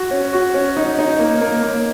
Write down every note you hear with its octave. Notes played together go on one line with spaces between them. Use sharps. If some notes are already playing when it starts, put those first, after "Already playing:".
Already playing: F#4
C#4
F#4
C#4
D#4
D#4
A#3
A#3
A#3